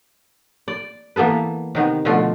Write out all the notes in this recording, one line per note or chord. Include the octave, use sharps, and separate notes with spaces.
D5
E3 A#3 B3 A4 B4
C3 D#3 B3
B2 D3 F3 A3 F4 A4